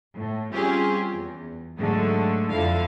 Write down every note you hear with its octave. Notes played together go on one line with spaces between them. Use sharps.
A2
G3 C4 C#4 F4 G4 G#4
E2
G#2 D3 F#3 G#3 A3
F2 D3 E4 F5